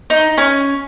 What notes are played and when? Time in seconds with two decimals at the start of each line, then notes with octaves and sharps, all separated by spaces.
0.10 D#4
0.37 C#4 G#5